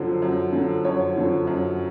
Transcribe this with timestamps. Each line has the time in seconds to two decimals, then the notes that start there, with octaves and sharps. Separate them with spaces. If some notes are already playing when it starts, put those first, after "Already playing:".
Already playing: F#2 D3 F3 C5
0.22 F#2
0.52 D3
0.58 F3
0.85 F#2 C#5
1.16 D3 F3
1.47 F#2